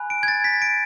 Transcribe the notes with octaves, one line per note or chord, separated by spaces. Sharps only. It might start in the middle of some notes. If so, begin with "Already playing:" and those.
Already playing: G#5 B5 F#6
D7
G#6
A6
B6
D7